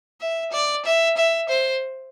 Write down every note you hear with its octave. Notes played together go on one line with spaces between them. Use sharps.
E5
D5
E5
E5
C5